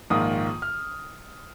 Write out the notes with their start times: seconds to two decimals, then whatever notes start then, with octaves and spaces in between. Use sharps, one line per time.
0.10 A#1 G#2 D#3 A#3 F4 D#6
0.62 F6